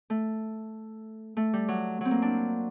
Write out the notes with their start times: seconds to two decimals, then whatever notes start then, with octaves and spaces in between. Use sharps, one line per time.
0.10 A3
1.37 A3
1.53 G3
1.68 F#3
2.01 F#3 C4
2.11 A#3
2.22 D4